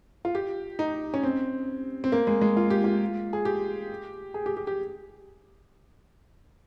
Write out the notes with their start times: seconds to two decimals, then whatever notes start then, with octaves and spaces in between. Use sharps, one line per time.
0.25 F4
0.35 G4
0.79 D#4
1.14 C#4
1.23 C4
2.04 C4
2.12 A#3
2.27 G#3
2.41 G#3
2.57 F4
2.70 G4
2.84 F4
3.33 G#4
3.45 G4
4.34 G#4
4.46 G4
4.57 G4
4.67 G4